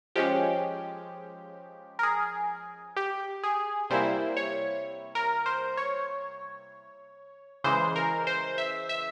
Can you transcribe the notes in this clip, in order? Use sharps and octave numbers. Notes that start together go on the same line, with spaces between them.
F3 G#3 C#4 G4
A#4
G#4
G4
G#4
C3 G3 A#3 E4 C5
C#5
A#4
C5
C#5
C#3 E3 G#3 C5
A#4
C5
E5
E5